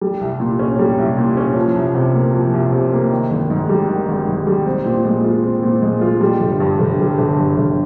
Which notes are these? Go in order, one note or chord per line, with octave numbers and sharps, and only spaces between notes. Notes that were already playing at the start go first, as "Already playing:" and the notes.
G3
C2
A#2
C#4
G3
C2
A#2
C#4
F3
C2
C3
A#3
F3
C2
C3
A#3
D#3
G#1
G#2
G3
D#3
G#1
G#2
G3
C4
A#2
G#3
F4
C4
A#2
G#3
F4
G3
G1
G2
G1
G3
G1
G2
G1